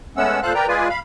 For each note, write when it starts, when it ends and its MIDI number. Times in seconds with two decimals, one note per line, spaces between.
0.17 0.40 56
0.17 0.40 57
0.17 0.40 59
0.17 0.40 61
0.17 0.40 78
0.17 0.40 88
0.43 0.53 46
0.43 0.53 69
0.43 0.53 72
0.43 0.53 77
0.43 0.53 90
0.54 0.67 70
0.54 0.67 71
0.54 0.67 74
0.54 0.67 79
0.54 0.67 82
0.68 0.88 56
0.68 0.88 65
0.68 0.88 68
0.68 0.88 71
0.68 0.88 74
0.68 0.88 80
0.89 0.99 77
0.89 0.99 83